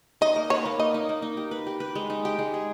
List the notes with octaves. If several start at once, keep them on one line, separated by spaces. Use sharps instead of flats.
D#4 D#5
A#3
B4 C#5
A#3
D#4 D#5
D#4
A#3
D#4
G4
B4
G4
B4
G#3
D#4
G4
G#3
G#4